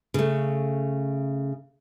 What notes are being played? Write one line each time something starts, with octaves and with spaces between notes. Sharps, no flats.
C#3 A3